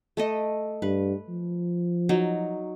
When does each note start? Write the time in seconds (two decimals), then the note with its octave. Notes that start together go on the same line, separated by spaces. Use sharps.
0.17 A3 A4 D#5
0.82 G2 B4
1.28 F3
2.09 F#3 D#4